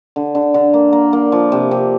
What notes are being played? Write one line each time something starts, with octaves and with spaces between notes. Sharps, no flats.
D3
D3
D3
A#3
A#3
A#3
F3
C3
C3